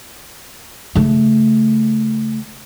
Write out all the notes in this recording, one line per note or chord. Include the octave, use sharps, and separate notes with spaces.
C#3 A3